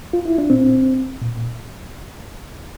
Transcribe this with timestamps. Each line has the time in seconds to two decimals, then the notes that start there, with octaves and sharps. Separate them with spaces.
0.13 F4
0.26 E4
0.38 D4
0.50 A#2 C4
1.22 A#2